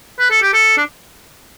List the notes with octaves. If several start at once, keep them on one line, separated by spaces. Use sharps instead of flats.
B4
A4
G4
A4
D4